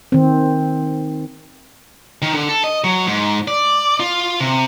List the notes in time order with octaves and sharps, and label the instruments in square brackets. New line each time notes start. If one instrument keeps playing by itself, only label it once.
[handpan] D#3 C4
[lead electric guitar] D#3
D3
A4
D#5
F#3
G#2
D5
F4
C3